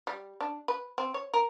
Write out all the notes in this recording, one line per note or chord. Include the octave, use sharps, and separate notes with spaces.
G3
D4
B4
C4
C#5
A#4